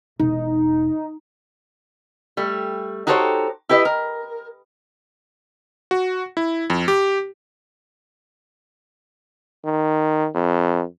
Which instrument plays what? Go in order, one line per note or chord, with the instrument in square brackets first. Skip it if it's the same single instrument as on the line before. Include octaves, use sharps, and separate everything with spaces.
[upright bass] E1 [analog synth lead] D#4
[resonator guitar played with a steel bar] G3 A3
D#4 F#4 G4 A4 C5 C#5
E4 G4 B4 D#5
A#4
[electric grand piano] F#4
E4
F2
G4
[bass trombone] D#3
F2